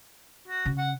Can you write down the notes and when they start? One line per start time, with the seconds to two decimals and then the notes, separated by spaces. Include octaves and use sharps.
0.48 F#4
0.66 C#3
0.78 F#5